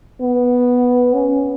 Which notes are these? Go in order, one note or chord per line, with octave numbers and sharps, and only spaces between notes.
B3
C#4